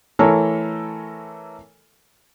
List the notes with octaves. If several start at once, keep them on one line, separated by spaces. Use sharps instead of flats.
E3 A3 A4 A#4 C#5